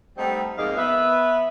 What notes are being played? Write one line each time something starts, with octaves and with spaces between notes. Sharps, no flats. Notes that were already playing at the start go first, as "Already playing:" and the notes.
G3 A3 B3 C4 D#4
F2 G#2 A#3 G#4 D#5 F5
B3 B4 E5